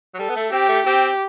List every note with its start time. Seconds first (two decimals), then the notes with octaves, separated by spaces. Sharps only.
0.15 F#3
0.19 G3 A4
0.30 B3
0.36 A3
0.52 C4 G4
0.69 A3
0.86 C4 G4